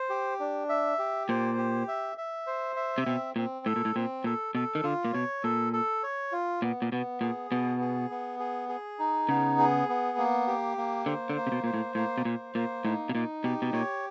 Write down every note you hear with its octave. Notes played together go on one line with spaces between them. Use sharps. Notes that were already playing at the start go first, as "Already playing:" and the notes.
Already playing: C5
G4
D4
E5
G4
A#2 C5
G4
E5
E5
C5
E5
C3
B2 C4
A#2 C4
A2 A4
A#2
A2
A#2 C4
A#2 A4
B2 A4
D#3
D3 F4
A#2
B2 C#5
A#2 A4
A4
C#5
F4
A#2 B3
A#2
B2 B3
A#2 G#4
B2 B3
G#4
B3
G#4
G#4
D#4
C#3 B3
G#4
B3
A#3
G4
A#3
D3 C5
D3
A#3
C3
B2
A#2 C5
A2
A2 A#3
B2
A#2 C5
A#2 A#3
A2 D#4
B2
A#2 D#4
B2 G4
B2
A#2 C#5